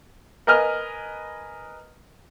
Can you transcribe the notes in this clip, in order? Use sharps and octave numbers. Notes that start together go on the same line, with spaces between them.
A#4 B4 D#5 G#5 F6